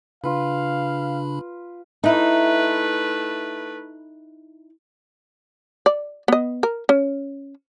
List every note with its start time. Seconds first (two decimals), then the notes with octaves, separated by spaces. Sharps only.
0.24 C#3 D4 F4 B4 F5 B5
2.04 A3 D#4 E4 B4
5.86 D5
6.28 B3 D#5
6.63 A#4
6.89 C#4